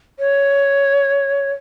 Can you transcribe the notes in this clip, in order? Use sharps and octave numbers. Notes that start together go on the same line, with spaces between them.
C#5